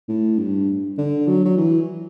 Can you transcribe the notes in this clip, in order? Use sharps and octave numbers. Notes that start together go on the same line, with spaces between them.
A2
G2
D3
F#3
F#3
E3